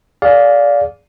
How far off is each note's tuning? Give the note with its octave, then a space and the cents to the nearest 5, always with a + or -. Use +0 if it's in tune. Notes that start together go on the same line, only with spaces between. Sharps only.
G#4 +0 D5 -20 F5 +10